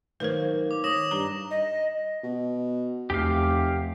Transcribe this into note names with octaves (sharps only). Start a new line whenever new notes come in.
D#3 F#3 A#3 B4 C5
D6
C#5 D#6 A#6 E7
G2 A#5
D#5
B2
F1 E2 G4 F5